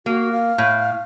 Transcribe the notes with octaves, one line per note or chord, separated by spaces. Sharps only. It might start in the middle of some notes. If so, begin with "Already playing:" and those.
A#3 F#4
F5
A2